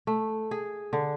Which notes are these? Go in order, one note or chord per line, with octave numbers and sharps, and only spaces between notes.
A3
G#4
D3